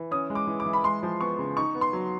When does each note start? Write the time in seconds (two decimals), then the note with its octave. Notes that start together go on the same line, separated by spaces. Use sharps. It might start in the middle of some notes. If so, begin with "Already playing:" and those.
Already playing: E3
0.11 C#4 D#6
0.30 G#3
0.35 D6
0.47 E3
0.60 D6
0.66 E3
0.73 B5
0.84 G#3 C6
1.03 F3
1.20 B3 C#6
1.39 C#3
1.57 D#4 C#6
1.75 B3
1.81 C6
1.93 F#3